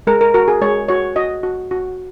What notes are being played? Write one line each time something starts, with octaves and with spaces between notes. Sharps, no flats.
G#3 A#4
A#4
F#4 A#4
G#4
G#3 C#5
F#4 C#5
F#4 D#5
F#4
F#4